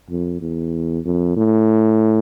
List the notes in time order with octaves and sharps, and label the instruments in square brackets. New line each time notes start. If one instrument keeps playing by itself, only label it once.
[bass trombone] F2
E2
F2
A2